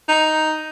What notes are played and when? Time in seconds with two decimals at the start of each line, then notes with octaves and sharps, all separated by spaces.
0.09 D#4